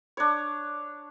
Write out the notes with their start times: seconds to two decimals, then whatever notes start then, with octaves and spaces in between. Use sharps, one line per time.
0.17 D4 C#5